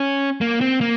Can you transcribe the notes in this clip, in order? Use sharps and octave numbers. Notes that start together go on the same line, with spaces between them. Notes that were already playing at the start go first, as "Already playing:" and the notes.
Already playing: C#4
A#3
C4
A#3